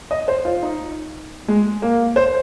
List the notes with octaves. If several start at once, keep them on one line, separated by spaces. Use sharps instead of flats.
D#5
C5
F4
D#4
G#3
A#3
C5